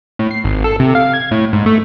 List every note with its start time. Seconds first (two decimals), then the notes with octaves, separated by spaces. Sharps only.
0.19 A2
0.31 C7
0.44 G#1
0.64 A4
0.80 C3
0.95 F5
1.13 G#6
1.31 A2
1.53 G#2
1.66 A3